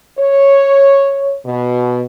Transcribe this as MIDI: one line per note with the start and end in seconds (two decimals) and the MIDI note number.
0.19 1.37 73
1.45 2.05 47